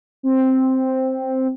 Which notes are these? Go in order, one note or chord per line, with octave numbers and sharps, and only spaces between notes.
C4